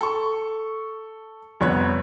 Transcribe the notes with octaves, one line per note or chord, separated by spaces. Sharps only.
A4 C#6
C2 F2 B3 C#5 B5 F#6